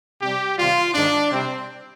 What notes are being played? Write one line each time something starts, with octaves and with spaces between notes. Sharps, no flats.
C3 G3 G4
C3 D#3 G3 F4
G#2 D#3 G#3 D4
C3 G3 C4